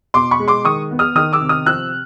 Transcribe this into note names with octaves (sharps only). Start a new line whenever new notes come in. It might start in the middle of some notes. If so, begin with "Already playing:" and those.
B2 C6 D6
B5 C#6
G#3
C6 D6
D#3 C#6 D#6
B3
D#6 F6
D#3 D#6 F6
D6 E6
C3
D#6 F6
F3 E6 F#6